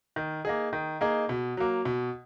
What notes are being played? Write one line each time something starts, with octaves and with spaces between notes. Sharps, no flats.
D#3
A#3 D#4 G#4
D#3
A#3 D#4 G#4
B2
F#3 A#3
B2